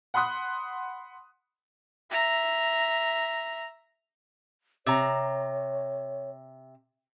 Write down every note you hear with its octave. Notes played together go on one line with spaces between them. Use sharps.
F#5 B5 C6 D#6 F#6
E5 A#5
C3 C#5 A#5